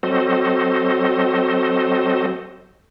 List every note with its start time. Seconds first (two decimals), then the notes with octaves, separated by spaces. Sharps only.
0.03 F#3 C4 F#4 A4 C5 D#5